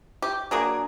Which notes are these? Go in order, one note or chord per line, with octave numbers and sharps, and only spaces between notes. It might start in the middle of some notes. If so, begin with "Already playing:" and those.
G4
F#3 A#3 D4 G#4